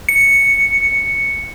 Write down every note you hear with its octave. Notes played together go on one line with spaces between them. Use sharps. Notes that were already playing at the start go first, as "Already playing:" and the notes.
C#7